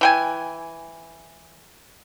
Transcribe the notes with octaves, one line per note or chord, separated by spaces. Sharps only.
E3 G5 G#5